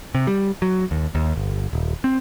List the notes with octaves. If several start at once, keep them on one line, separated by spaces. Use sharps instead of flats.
C3
G3
F#3
D#2
D#2
G1
D#1
C4